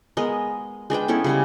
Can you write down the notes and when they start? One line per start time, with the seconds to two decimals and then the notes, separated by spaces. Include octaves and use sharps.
0.17 G#3 B3 A#4 D#5
0.90 G#3 D4 B4 G5
1.08 B3 C#4 E4 A4
1.24 C#3 G3 G#3